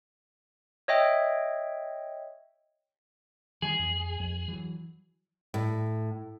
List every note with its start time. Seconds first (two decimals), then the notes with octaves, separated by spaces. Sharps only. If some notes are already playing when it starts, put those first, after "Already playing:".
0.88 C#5 D#5 E5 G5
3.62 D#3 E3 G3 G#4
3.79 F2
4.20 F2
4.48 E3 F#3
5.54 A2